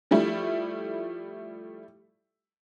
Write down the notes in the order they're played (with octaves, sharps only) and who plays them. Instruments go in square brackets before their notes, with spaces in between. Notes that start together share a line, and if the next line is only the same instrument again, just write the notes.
[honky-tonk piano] F3 G3 A3 E4